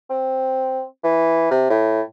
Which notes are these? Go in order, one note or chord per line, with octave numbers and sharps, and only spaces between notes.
C4
E3
C3
A2